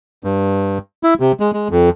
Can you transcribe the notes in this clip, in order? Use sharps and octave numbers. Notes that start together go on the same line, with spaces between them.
G2
E4
C3
G#3
G#3
F2